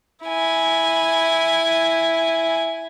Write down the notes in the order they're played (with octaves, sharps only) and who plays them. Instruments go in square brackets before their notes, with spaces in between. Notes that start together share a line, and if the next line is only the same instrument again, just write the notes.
[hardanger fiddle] E4 G#5